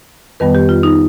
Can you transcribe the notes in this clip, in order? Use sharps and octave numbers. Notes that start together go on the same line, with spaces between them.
F2 D#3 G3 B3 B4
G4
F4
D#4